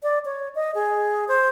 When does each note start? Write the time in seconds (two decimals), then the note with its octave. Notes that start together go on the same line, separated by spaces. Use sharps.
0.03 D5
0.25 C#5
0.55 D#5
0.75 G#4
1.28 C5